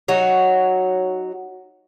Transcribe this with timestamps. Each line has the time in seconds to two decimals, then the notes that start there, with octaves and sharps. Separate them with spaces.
0.08 F#3 D#4 F#4 C#5